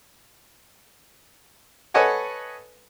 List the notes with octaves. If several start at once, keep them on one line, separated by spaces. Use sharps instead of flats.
A4 B4 C#5 D#5 F#5 G#5